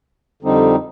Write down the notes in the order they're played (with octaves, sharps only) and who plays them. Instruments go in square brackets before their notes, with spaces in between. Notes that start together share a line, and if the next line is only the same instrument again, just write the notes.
[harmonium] F2 D3 G3 C4 D#4